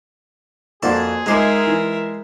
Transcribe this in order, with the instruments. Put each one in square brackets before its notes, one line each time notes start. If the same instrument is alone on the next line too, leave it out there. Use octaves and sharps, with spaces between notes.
[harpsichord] F2 D5 A5 [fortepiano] A#3 F#4 C6 [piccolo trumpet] G#4
[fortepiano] G#2 D#5 D6 [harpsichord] G#3 C5 [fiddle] A#4 E5
[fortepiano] E3